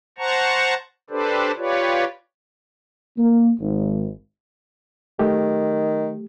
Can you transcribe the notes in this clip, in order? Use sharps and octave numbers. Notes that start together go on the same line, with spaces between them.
C5 F#5 A5 A#5 C#6
D4 G4 A4 B4 C5 D5
F4 G4 B4 C#5 D5
A#3
G#1
D#3 F#3 A3 G4